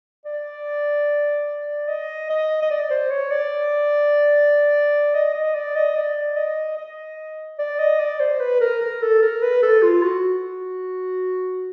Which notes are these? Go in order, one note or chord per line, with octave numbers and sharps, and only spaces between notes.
D5
D#5
D#5
D#5
D5
C5
C#5
D5
D#5
D#5
D5
D#5
D5
D#5
D#5
D5
D#5
D5
C5
B4
A#4
A#4
A4
A#4
B4
A4
F4
F#4